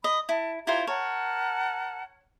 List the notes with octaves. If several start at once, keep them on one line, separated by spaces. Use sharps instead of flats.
D#5 B5 D#6
E4 A5
E4 F4 G4 C5 A#5 G#6
A#4 C#5 F#5 A5